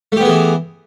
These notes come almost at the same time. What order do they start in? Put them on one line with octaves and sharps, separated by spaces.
A3 G4 B3 G#4 E3